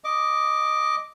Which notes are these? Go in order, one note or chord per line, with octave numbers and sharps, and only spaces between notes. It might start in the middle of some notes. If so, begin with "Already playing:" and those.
D#5 D6